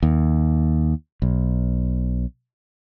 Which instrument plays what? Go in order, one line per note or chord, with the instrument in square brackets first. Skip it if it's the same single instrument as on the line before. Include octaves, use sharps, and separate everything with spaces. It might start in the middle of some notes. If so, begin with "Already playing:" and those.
[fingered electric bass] D#2
B1